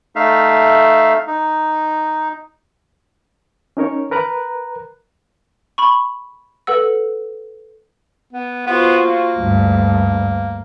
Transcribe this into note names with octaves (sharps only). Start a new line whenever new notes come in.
A3 D#4 E5 F5
D#4
C#4 D#4 A#4 C#5
A#4 B4 A#5 F#6
B5 C#6
A4 B4 F#5 E6
B3
B3 F4 F#4 C5
A#3
D2 G2